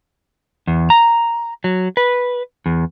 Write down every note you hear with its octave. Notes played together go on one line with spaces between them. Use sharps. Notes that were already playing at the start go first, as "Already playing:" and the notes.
E2
A#5
F#3
B4
E2